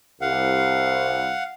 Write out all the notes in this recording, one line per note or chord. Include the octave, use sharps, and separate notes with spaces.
C2 F5 F#5